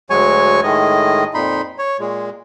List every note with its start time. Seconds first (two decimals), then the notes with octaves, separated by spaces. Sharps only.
0.10 D2 F#3 G#3 C#5 G#5 C#6
0.63 A2 D#3 G#3 D#5
1.34 F2 A#2 D#4 B5 C6
1.79 C#5
2.00 A#2 G#3